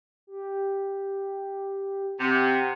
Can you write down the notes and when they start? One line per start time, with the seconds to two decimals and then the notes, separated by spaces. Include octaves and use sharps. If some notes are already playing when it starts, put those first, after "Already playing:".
0.27 G4
2.19 C3 F#5